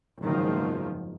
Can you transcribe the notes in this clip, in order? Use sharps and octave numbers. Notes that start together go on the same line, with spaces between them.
F#1 E2 G#2 D#3 F3